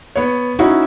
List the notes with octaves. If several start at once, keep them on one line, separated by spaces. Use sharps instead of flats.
B3 C#5
C#4 D#4 E4 F#4